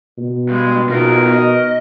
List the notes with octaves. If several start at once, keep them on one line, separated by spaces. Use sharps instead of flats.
B2
G2 G#3
B2 F3 B3 D#4 F#4 A#4
D#5